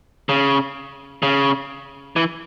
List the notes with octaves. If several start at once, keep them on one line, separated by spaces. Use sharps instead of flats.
C#3
C#3
E3